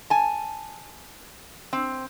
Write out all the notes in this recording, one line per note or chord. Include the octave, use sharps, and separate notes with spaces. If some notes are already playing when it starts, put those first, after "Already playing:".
G#5 A5
C4